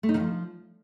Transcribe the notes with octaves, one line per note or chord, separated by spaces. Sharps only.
A3
D#4
D#3
F3